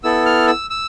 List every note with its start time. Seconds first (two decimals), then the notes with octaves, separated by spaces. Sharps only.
0.04 B3 E4 A4 E6
0.26 F6
0.47 E6
0.70 E6